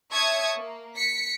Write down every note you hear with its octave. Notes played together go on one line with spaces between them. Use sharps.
C#5 E5 A5 C#6 D#6 G#6
A#3
B6 C#7